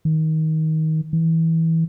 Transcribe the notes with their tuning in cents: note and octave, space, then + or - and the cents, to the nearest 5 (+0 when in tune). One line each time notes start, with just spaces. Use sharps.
D#3 +20
E3 -20